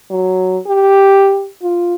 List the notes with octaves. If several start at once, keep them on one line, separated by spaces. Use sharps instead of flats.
F#3
G4
F4